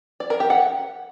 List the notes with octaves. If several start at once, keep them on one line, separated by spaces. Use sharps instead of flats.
D5
A#4
G4
F#5